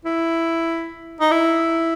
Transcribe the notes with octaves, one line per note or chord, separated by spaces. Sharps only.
E4
D#4
E4